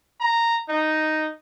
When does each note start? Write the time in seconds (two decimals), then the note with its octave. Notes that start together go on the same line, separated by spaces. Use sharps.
0.20 A#5
0.69 D#4